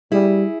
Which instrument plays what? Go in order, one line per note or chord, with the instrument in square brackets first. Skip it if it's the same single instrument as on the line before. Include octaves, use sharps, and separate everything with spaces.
[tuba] G3 [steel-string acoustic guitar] E4 G#4